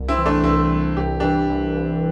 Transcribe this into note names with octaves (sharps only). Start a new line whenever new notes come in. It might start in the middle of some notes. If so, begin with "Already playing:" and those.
Already playing: C2
C4 E4
E3
A3 D4
C2 C4 E4
C2
C2 G4
E3 D4 G4
C2
C2